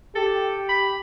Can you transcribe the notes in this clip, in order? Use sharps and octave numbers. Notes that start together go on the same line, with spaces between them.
G4 A4
B5